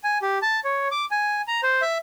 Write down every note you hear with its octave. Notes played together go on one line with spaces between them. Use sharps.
G#5
G4
A5
C#5
D6
G#5
A#5
C5
E5